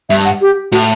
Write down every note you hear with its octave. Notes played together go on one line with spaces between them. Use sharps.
G2 E5
F#5
G4
A2 F#4